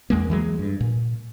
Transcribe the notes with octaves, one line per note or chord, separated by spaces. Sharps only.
E2 G#3 A#3
E3 F#3 G#3
G2
A#2